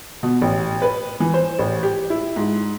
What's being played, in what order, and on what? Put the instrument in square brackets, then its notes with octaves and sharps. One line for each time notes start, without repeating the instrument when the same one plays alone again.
[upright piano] B2
A1
B4
E3
C5
A1
G4
E4
G#2